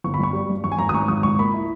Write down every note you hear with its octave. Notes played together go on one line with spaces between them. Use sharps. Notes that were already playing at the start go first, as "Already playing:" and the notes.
G1 C#6
B5
G2 C#6
G3
G2
G#1 C#6
G#5
G#1 A#5
D#6
G#2 C#6
G#1 D#6
C#2 C#6
A#3 B5
E4